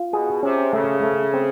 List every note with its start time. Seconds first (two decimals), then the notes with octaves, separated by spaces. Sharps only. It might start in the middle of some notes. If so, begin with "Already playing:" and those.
Already playing: F4
0.13 B2 G#4
0.43 C3 C#4
0.73 C#3 A3
1.03 A3
1.34 C4